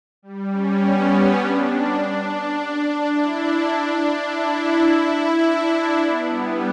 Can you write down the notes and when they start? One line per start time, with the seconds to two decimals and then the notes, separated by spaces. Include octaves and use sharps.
0.22 G3
0.51 C#4
0.80 B3
1.09 C#4
1.37 D4
1.95 D4
3.11 E4
3.40 D4
4.26 E4
5.42 D4
5.99 B3
6.28 G3